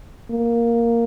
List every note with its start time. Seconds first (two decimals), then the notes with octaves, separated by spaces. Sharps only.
0.31 A#3